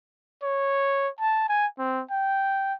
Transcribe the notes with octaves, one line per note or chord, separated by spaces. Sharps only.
C#5
A5
G#5
C4
G5